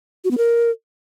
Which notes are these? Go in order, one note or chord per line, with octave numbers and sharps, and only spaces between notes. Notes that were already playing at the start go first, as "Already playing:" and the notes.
F#4
B3
A#4